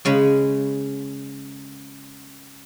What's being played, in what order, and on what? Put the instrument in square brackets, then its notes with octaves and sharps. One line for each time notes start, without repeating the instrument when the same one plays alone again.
[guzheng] C#3 G#3 C#4 B5